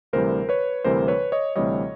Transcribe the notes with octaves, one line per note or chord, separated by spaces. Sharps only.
D2 C3 E3 G3 A#4 C5
B4 C#5
D2 C3 E3 G3 A#4 C5
B4 C#5
C#5 D#5
D2 C3 E3 G3 C#5 D#5